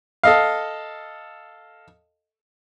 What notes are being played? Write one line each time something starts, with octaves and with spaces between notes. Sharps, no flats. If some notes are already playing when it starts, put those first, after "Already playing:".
A4 D#5 F5